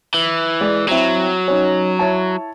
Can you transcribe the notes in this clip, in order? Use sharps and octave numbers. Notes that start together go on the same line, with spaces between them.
E3
G#3 D5
F#3 C4 E4
C#4 D#4
E4 C#5 A5